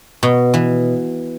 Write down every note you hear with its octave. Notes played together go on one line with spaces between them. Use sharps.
B2
E3